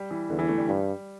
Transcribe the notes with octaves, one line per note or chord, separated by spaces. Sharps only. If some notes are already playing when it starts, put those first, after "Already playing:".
Already playing: G3
E3
E2 D3
E3
A3
G3
G2